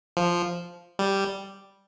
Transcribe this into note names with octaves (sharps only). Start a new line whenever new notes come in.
F3
G3